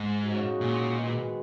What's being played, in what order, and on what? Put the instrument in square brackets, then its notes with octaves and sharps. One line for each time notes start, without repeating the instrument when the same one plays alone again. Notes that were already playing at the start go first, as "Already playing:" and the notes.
Already playing: [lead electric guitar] G#2
[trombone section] C#3 G#3 D#4 F#4
[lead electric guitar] A#2
[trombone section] D#3 G#3 B3 F#4